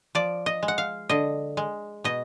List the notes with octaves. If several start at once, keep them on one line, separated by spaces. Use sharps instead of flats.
F3 D5
D#5
G#3
F#5
F5
D3 D#5
G#3
B2 D#5